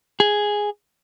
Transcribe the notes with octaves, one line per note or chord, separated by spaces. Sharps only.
G#4